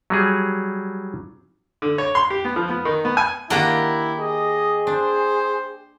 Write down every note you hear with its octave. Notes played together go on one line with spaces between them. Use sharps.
F#3 G3 G#4
D3
C#5
C6
G4
B3
F3
B3
D#3
B3
G#5
D#3 A#3 D4 E4 G4 F#5 A#5
G#4 D#5
D4 C5